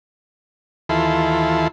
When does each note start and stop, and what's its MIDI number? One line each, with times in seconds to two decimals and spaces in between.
0.89 1.68 39
0.89 1.68 52
0.89 1.68 64
0.89 1.68 65
0.89 1.68 69
0.89 1.68 84